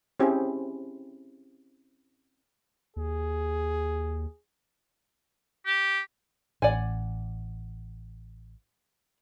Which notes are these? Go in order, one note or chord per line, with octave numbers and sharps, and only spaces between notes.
C4 C#4 E4 G4 G#4 C5
D#2 G#4
G4
A1 D5 F#5 G#5